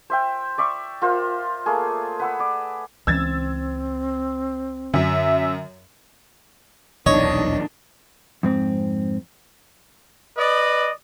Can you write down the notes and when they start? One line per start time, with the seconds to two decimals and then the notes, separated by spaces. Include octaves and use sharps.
0.10 C5 E5 G5
0.58 D5 E5 C#6
1.02 F4 A#4 C5 E5
1.66 A3 A#3 G#4
2.20 B4 F#5 E6
2.40 D5
3.07 C#2 E3 C4 C#4 E6 G#6 A6
4.94 F#2 D3 E5
7.06 D#1 B1 E2 D#3 D4 C#5 D#5
8.43 F2 G#2 C4
10.37 B4 D5 D#5